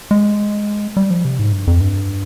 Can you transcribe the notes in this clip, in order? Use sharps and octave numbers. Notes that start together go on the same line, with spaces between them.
G#3
G3
F3
C3
G#2
G2
F2
G2